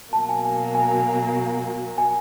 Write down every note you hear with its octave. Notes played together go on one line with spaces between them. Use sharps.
B2 F#3 A#3 A5
G#5
G#5
G#5
G#5